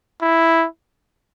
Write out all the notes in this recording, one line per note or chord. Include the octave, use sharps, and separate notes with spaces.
E4